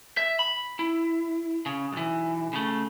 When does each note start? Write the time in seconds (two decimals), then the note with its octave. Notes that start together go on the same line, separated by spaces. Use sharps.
0.17 E5
0.39 B5
0.79 E4
1.66 C#3
1.92 B1 E3
2.53 C#3 A3